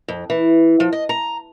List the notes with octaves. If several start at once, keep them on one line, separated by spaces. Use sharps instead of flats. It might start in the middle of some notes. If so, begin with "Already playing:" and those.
F2
E3
F3
D#5
A#5